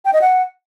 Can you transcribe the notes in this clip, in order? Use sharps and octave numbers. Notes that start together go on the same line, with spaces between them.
G5
D#5
F#5